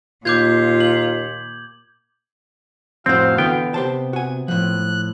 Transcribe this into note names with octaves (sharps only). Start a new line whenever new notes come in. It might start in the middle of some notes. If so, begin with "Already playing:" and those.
D#2 A#2 F4 D6 G6 G#6
F#7
F2 A2 C4 F#4 C5 F5
D3 E3 B3 G5
C3 G4 C5 A5
F#4 G#5
A2 F3 F#6